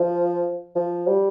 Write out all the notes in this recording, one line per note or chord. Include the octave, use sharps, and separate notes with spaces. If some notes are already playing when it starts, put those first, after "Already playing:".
Already playing: F3
F3
G3